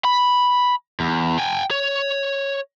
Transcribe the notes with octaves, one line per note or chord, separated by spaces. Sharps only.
B5
E2
G5 G#5
C#5